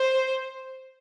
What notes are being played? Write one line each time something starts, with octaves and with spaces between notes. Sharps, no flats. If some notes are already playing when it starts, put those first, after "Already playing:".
Already playing: C5